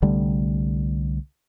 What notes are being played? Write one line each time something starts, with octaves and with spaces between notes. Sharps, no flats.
C2 D3 G3 A3